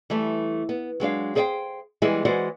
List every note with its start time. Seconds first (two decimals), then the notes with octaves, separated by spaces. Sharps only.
0.10 E3 G3 A3
0.69 B3
1.00 F#3 G#3 D4 F5
1.35 G4 G#4 C5 D5 F5 G5
2.02 E3 G3 G#3 B3 E4 G#4
2.25 E3 G#3 F#4 C5 D5 F#5